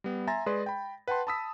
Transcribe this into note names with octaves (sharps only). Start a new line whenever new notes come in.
G3 B3
E5 G#5 A#5 C6 A6 A#6
G#3 G#4 B4 D5 C6
G5 B5
B4 F#5 G5 A5 C6
A5 B5 D#6 E6 B6